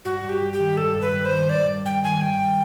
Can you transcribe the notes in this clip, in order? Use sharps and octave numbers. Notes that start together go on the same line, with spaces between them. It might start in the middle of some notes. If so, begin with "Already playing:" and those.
G2 F#4
G2
G4
G3
G4
D#3
G2 A4
G2
B4
G3
C5
D#3
G2 D5
G2
G3 G5
D#3 G#5
G2 G5